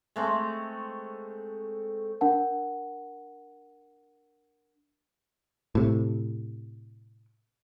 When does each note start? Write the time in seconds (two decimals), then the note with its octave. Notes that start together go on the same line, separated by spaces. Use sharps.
0.16 G#3 A3 C4
2.21 D4 A#4 F#5 A5
5.75 A2 C3